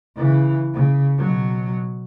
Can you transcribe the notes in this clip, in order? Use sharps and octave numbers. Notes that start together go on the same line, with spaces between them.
C#3 E3
C#3
B2 F#3